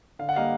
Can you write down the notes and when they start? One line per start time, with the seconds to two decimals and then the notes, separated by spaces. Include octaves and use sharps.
0.19 D3 F5
0.29 F#5
0.36 G3 A#3 D#5 F5